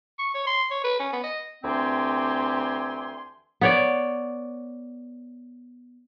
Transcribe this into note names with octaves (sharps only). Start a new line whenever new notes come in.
C#6
C#5
C6
C#5
B4
C#4
B3
D#5
D2 E3 C4 G4 G#5 C6
B3 C#5 D5